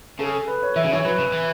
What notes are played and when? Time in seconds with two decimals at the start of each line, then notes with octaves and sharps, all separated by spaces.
0.19 C#3 A4
0.47 B4
0.63 C#5
0.76 E3 E5
0.85 C#3
0.91 E3 C#5
1.05 F#3 B4
1.19 C#3
1.32 E3